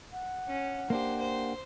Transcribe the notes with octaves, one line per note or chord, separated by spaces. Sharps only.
F#5
C#4
A#3 D4 G4 C5
C5